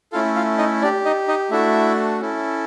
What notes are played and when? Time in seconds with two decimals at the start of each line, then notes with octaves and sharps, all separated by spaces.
0.12 A3 C#4 E4 F4 A4 F5
0.36 F4 F5
0.58 D#4 D#5
0.82 D4 G4 D5
1.05 D#4 D#5
1.28 D#4 D#5
1.51 A3 D4 E4 F#4 A4 E5
2.20 C#4 E4 A4